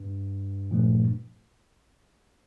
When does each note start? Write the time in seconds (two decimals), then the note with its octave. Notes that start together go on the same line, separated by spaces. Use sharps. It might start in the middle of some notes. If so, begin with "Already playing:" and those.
Already playing: G2
0.71 A#2 F3 A3